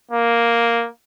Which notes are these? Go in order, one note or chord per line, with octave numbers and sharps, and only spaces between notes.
A#3